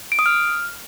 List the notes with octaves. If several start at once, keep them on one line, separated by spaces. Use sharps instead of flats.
D7
D#6
F6